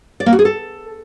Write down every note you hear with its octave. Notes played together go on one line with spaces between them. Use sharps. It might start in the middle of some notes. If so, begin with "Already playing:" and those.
D5
A#3
F#4
G#4
A4